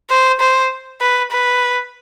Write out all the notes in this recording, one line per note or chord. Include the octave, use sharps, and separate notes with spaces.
C5
C5
B4
B4